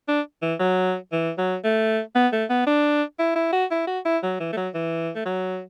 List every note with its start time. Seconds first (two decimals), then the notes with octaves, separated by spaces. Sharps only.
0.08 D4
0.42 E3
0.60 F#3
1.12 E3
1.38 F#3
1.64 A3
2.15 B3
2.32 A3
2.50 B3
2.67 D4
3.19 E4
3.35 E4
3.53 F#4
3.71 E4
3.87 F#4
4.05 E4
4.23 F#3
4.40 E3
4.53 A3
4.57 F#3
4.74 E3
5.15 A3
5.25 F#3